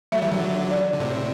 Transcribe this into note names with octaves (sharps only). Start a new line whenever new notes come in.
F#3 A3 E5
E3 G3
D3 F#3
D5
D3
A2 C3